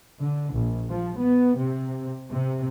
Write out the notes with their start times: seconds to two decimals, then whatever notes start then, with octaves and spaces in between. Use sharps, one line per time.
0.21 D3
0.54 A#1
0.89 F3
1.18 B3
1.58 C3
2.31 C3